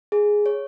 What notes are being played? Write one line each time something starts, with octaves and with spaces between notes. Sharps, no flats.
G#4
C#5